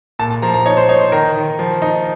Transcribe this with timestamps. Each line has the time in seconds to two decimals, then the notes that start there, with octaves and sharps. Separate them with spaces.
0.19 A#2 A5
0.30 A5
0.42 F3 A#5
0.54 A#5
0.66 D#4 C#5
0.77 C5
0.89 D#4 C#5
1.01 C5
1.12 D#3 A#4
1.36 D#3
1.59 F3
1.82 D#4